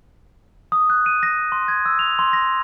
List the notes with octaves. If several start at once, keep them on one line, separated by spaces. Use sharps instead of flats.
D#6
F#6
D#7
A#6
C6
G#6
E6
F7
C6
A#6